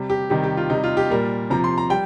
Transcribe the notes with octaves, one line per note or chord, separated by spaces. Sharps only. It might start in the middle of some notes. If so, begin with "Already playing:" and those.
Already playing: C3 G3
G4
C3 D#3 G3 G4
G4
F4
C3 G3 D#4
F4
G4
A#2 G3 A#4
C3 F3 A#5
C6
A#5
G3 G5